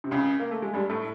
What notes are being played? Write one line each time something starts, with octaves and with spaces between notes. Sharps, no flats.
C3
C#2 C#3
A#3
A3
G#3
G2 G3
A2 A3